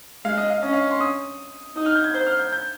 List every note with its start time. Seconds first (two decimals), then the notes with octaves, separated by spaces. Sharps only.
0.25 G#3 F5
0.38 D#5
0.50 F5
0.62 C#4 D#5
0.73 F5
0.91 C6
1.01 D#6
1.76 D#4 D#6
1.86 F6
1.95 G6
2.04 G#6
2.14 C5 G6
2.26 F6
2.39 G6
2.53 G6